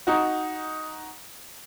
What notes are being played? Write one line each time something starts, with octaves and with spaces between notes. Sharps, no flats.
D#4 F#4